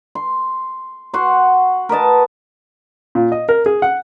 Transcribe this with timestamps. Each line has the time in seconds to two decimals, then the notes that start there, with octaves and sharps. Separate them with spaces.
0.15 C6
1.14 F#4 F#5 C6
1.89 A#4 B4 D#5 A5
3.15 A#2
3.32 D#5
3.49 A#4
3.66 G#4
3.82 F#5